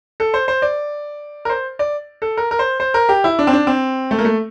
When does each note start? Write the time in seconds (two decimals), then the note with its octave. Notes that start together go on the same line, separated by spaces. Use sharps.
0.20 A4
0.34 C5
0.48 C5
0.62 D5
1.45 A#4
1.50 C5
1.79 D5
2.22 A4
2.37 A#4
2.51 A#4
2.59 C5
2.80 C5
2.94 A#4
3.09 G4
3.24 E4
3.39 D4
3.47 C4
3.53 D4
3.67 C4
4.11 A3
4.19 A#3
4.25 A3